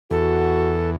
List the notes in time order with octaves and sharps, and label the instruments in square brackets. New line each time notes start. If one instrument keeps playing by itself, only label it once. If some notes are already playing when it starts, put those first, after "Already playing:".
[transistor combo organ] E2 [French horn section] F#4 [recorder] A4